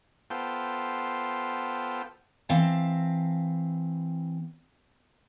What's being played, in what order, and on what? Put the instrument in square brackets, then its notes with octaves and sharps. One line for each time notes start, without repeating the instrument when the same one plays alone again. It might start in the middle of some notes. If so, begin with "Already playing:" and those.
[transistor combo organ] B3 F4 A4 C5 G5
[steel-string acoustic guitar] E3 C4 E5 F5 A5